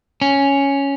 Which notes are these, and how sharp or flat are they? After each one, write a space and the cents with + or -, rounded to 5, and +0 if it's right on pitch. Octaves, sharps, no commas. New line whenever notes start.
C#4 +5